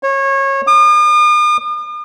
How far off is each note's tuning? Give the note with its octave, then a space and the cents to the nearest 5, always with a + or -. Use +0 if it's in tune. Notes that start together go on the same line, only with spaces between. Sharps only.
C#5 -25
D#6 -45